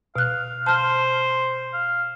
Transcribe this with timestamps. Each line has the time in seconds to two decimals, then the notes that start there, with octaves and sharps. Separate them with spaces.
0.16 B2 F5 F#6
0.66 C5 A5 F6
1.73 F5